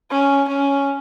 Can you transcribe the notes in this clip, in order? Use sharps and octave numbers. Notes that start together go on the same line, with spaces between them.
C#4
C#4